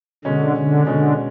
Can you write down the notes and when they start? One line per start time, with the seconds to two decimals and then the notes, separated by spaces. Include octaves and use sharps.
0.25 B2 D3 G#3 C#4
0.56 D3
0.87 B2 D3 G#3 C#4